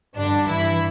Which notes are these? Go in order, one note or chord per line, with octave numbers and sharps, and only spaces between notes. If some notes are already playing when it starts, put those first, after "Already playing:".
G2 D3 D4
G2 E3 E4